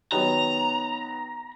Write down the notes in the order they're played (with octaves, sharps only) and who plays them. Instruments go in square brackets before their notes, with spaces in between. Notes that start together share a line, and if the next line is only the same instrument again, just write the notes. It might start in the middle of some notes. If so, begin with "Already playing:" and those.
[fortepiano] D#3 F#3 B3 [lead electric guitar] A#5